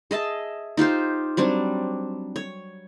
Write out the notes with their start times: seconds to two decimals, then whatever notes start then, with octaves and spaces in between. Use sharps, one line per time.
0.11 G#4 D#5 E5 A5
0.77 D#4 F4 G4 C5
1.37 F#3 G3 C4 D4
2.36 C#5